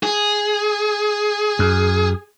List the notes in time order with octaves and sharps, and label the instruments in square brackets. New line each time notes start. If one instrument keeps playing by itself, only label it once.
[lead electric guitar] G#4
[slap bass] F#2